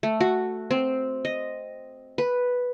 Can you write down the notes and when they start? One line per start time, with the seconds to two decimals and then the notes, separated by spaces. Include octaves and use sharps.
0.03 A3
0.20 F#4
0.71 C4
1.25 D#5
2.18 B4